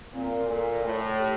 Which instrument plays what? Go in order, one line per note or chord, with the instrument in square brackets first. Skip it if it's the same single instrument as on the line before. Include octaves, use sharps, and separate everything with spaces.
[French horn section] A#2 [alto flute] C4
[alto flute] A#4
[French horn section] A#2 [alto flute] A4
[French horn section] A2
[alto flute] G4